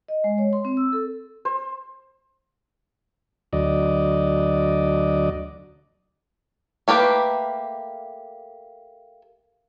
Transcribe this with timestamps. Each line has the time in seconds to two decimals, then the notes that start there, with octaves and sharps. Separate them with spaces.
0.08 D#5
0.24 G#3
0.38 C#5
0.53 C6
0.65 C4
0.77 E6
0.93 A4
1.45 C5
3.53 D2 F#3 D5 D#5
6.88 A3 A#3 G4 B4